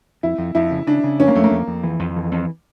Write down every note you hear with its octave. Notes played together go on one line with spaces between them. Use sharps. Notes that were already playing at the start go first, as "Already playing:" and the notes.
F2 E4
F2
F2 E4
C#3
C#3 D4
C#3
F2 C#4
A#3
F2 A3
A#3
F2
F2
E3
F2
E3
F2